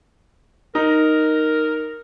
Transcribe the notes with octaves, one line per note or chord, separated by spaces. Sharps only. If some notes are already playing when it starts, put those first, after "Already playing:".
D#4 A#4